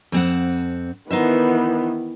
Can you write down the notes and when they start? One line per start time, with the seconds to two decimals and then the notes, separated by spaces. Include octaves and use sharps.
0.12 F2 C4 F#5
1.11 D#3 E3 B3 D#4 C5 E5